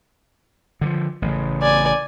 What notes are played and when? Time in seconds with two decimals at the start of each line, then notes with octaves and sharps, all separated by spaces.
0.81 D3 E3 F3
1.22 A1 C#3
1.61 D5 G#5